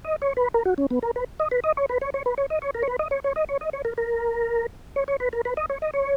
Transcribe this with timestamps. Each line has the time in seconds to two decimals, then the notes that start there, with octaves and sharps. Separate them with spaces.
0.05 D#5
0.22 C#5
0.37 B4
0.54 A#4
0.65 F#4
0.78 C#4
0.91 B3
1.02 A#4
1.16 B4
1.40 D#5
1.51 B4
1.64 D#5
1.77 C#5
1.89 B4
2.01 C#5
2.14 C#5
2.26 B4
2.38 C#5
2.50 D#5
2.62 C#5
2.75 A#4
2.83 C#5
2.88 B4
2.99 D#5
3.11 C#5
3.24 C#5
3.36 D#5
3.49 C#5
3.61 D#5
3.73 C#5
3.85 A#4
3.98 A#4
4.96 C#5
5.08 C#5
5.20 B4
5.33 A#4
5.45 B4
5.57 D#5
5.70 C#5
5.82 D#5
5.94 C#5